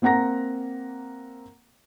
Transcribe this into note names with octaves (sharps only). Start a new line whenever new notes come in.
A#3 C4 F#5 A#5 A#6